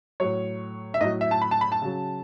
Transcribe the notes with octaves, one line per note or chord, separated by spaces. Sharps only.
A2 F#3 C#5
E5
A2 F#3 D#5
E5
A5
B5
A5
B5
A5
C#3 F#3